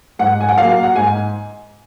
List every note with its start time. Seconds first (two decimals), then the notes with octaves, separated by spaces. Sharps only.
0.19 G#2 F#5
0.40 G#5
0.49 F#5
0.57 F#3 A#3 F5
0.83 F#5
0.95 G#2 G#5